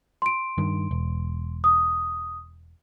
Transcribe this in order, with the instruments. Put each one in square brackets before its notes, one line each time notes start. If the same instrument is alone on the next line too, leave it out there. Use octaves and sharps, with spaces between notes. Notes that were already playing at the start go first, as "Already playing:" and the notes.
[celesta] C6 D7
[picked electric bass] G2 D#3
E1
[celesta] D#6